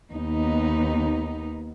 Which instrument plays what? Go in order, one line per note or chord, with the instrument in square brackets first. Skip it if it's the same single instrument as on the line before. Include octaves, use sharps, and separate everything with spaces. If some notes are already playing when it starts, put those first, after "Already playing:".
[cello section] D#2 B3 D#4